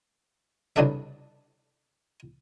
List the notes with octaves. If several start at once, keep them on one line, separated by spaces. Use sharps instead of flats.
C2 G2 C#3 D4 A4 E5